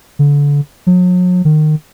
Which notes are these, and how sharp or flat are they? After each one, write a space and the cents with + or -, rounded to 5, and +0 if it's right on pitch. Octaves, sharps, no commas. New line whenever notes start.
D3 -30
F#3 -40
D#3 -25